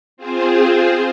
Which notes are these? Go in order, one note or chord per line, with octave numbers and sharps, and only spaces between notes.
C4 F4 G#4 C5